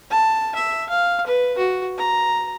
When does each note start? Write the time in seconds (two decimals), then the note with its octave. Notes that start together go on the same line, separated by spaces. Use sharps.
0.10 A5
0.55 E5
0.89 F5
1.27 B4
1.58 F#4
1.98 A#5